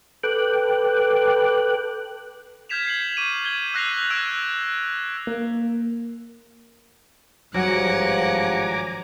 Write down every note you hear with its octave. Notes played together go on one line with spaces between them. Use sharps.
A4 B4 G5 D6 F#6
F6 G6 G#6 B6 E7 F7
G#6 C7 F7 F#7
C#6 D6 D#7
G6 G#6 G7
E6 F#6 A#6 C7 D#7 F7
E6 F#6 G#6 D7 E7
A#3
G#1 G2 F3 F#3 F#5 G#5 A#5 D6